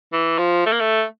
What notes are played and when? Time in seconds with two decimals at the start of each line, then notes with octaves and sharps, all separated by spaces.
0.13 E3
0.38 F3
0.66 A3
0.72 A#3
0.80 A3